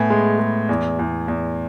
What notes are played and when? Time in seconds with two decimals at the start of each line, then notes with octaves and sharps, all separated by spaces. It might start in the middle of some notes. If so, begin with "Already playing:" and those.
Already playing: A2 B3 G#5
0.10 G#3
0.39 G#3
0.69 E2
0.99 E2
1.28 E2